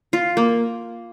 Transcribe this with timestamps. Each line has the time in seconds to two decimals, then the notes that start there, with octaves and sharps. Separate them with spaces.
0.13 F4
0.37 A#3